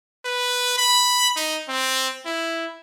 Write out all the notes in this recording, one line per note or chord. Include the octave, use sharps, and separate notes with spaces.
B4
B5
D#4
C4
E4